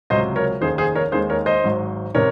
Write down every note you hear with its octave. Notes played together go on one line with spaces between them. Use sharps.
C#2 C3 F#3 C5 D#5
A#4 C#5
F1 D#2 D#3 G#4 C5
G#4 C5
A#4 C#5
D#2 D#3 G#3 G#4 C5
A#4 C#5
C5 D#5
G#1 G#2 F#3
C3 D#3 A#4 C#5